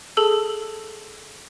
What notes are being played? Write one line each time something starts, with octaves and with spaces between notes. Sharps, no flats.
G#4 A4 A5 E6